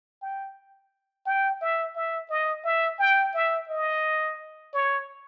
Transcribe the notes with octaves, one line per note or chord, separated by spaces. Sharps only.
G5
G5
E5
E5
D#5
E5
G5
E5
D#5
C#5